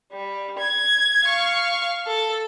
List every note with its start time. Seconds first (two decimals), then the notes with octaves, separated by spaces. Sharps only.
0.12 G3
0.58 G#6
1.24 F5 C#6
2.07 A4